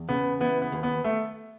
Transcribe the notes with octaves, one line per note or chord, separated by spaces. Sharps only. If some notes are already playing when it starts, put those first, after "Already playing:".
Already playing: E2
C#3 B3
E3 B3
B3
D#2
B3
A3